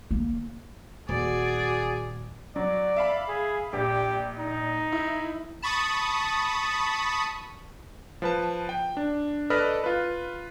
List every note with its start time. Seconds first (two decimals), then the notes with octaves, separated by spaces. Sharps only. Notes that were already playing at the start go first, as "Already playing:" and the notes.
0.11 A#3
1.09 D#1 F#4 G#4 D5
2.56 F#3 D5
2.96 E5 F5 B5
3.28 G#4
3.73 A#1 G4
4.39 D#4
4.92 E4
5.62 A5 B5 C#6 D#6
8.22 F3 B4 A5
8.69 G5
8.97 D4
9.50 A4 B4 D5 D#5 B5 F6
9.84 F4 B4